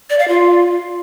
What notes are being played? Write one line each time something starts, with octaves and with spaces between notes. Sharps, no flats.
D5
F5
F4